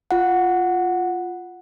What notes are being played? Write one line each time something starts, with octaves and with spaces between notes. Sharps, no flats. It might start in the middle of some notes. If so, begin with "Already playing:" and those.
F4 F#5